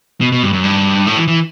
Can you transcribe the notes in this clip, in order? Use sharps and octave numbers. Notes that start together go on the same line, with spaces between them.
B2
B2
G2
F#2
G2
A2
E3
E3